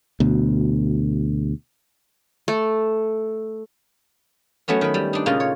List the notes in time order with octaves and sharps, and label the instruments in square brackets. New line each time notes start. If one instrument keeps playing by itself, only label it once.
[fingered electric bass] D2 B2
[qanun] A3
[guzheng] F#3 A3 B3 C#4
D#3 B4
G3
D4 D#4
A#2 C#3 D#4 F4
C#5